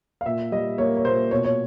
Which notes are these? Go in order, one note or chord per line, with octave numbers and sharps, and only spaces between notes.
F5
A#2 E5
G3 D#5
A#3 C#5
C#5
A#2 C5
B2 C#5
C#5